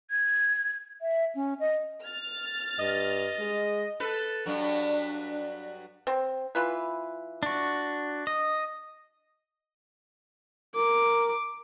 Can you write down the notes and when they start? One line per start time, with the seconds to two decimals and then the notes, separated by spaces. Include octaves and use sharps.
0.10 G#6
1.01 E5
1.35 C#4
1.60 D#5
2.04 F6 A6
2.79 G2 D#5
3.39 G#3
4.00 A4 B4
4.46 G2 F#3 D4
6.07 C4
6.55 E3 F4 B4
7.43 D4 F#4
8.27 D#5
10.76 A#4 D6